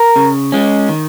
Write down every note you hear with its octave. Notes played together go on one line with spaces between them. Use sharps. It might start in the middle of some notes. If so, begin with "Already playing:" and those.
Already playing: A#4
C#3
G#3 C#4
D#3